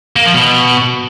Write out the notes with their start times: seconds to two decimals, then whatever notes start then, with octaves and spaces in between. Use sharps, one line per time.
0.16 A#3
0.25 F3
0.34 B2